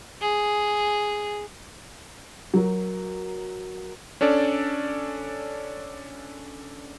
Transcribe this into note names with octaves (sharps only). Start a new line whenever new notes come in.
G#4
F#3 A#4
C#4 D4 A4 D5